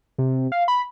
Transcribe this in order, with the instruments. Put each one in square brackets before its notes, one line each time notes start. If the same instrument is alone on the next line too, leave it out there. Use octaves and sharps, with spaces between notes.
[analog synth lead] C3
F5
B5